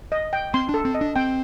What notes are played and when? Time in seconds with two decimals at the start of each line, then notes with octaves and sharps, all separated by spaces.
0.12 D#5
0.33 G5
0.54 C4 C6
0.69 D4
0.74 A4
0.85 C4
0.95 D#5
1.01 D4
1.16 C4 G5